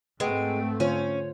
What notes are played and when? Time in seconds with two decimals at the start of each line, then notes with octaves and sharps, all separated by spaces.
0.20 G#2 G#3 A3 C4 B4 F#5 G5
0.80 D3 C#4 F4 C5 C#5